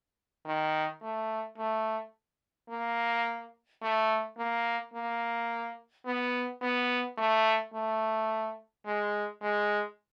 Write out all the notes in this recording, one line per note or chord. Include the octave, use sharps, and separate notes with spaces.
D#3
A3
A3
A#3
A3
A#3
A#3
B3
B3
A3
A3
G#3
G#3